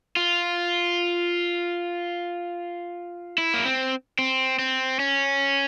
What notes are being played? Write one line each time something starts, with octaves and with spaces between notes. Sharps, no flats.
F4
E4
A#3
C4
C4
C4
C#4